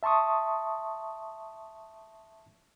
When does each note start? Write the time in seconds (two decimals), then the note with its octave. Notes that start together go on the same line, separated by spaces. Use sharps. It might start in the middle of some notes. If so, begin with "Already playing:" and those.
0.03 E5 A5 C6 C#6 D#6